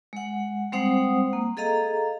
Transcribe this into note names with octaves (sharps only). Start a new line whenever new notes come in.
G#3 F#5
G3 G#3 C4 C5 F#5 D#6
A#3
G#4 A4 D#5 F5 A#5